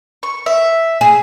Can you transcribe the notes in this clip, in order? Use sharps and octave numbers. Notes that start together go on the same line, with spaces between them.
C#6
E5
G#4